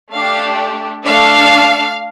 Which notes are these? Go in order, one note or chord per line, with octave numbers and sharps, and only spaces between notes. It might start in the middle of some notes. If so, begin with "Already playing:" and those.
A3 D4 G4 F5
A3 D4 A4 F5